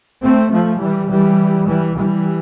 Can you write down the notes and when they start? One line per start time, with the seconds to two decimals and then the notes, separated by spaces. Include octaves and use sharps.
0.23 A3 C4
0.52 F3 A3
0.81 E3 G3
1.10 E3 G3
1.68 E3 G3
1.96 E3 G3